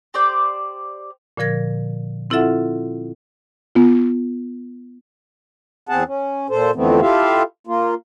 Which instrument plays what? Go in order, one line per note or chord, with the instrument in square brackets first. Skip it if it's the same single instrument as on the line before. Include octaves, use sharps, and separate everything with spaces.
[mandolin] G4 C5 D5 G6
[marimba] A#2 D3 F3 A#4 G#6 A#6
C4 E4 F4 A4 E5 F#5
B3 F4
[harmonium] E2 C4 G#4 F#5 A5
C#4
A#2 A4 C5
F2 D3 E3 A3 B3 C4
E4 F4 G4 A4 E5 F5
A#3 F4